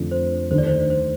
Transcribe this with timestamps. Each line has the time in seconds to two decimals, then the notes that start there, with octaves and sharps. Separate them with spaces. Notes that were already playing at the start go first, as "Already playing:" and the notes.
Already playing: F2 D3 A3 D4 F4
0.11 C5
0.50 D#2 D3 A3 D4 C5
0.58 D5
0.66 C5
0.90 C5